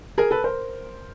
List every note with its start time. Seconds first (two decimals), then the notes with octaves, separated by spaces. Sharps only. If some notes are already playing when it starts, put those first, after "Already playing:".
0.18 G#4 A#4
0.31 A4 B4
0.44 A#4 C5